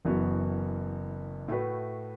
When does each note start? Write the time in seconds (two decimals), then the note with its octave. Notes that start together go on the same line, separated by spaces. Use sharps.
0.05 F#1 F#2 E3 B3 F#4
1.48 A2 A3 F#4 B4